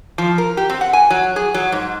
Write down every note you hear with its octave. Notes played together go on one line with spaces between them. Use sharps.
F3
A#4
G4
C4
F#5
G#5
F#3
G#4
F#3
G#2